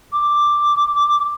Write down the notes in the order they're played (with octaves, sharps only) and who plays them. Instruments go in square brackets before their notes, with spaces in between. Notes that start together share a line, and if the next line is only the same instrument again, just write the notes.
[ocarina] D6